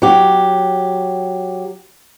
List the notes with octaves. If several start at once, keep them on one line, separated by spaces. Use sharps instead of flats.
F#3 G4